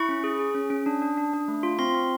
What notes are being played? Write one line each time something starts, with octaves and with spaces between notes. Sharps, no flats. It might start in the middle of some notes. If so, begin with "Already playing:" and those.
Already playing: E4 C#6
C#4
G#4
G#4
C#4
C#4
D4
D4
D4
D4
A3
F4
C4 C6
C4